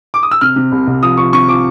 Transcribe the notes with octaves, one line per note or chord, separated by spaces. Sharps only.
D6
D#6
E6
C3 F6
C3
C2
C2
F3 D#6
F3 C#6
C3 C#6
F3 D6